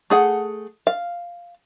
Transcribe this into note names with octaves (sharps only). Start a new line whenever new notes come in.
A3 G#4 F#5
F5